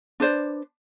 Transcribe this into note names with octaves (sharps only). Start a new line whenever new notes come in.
D4 B4 C5 D5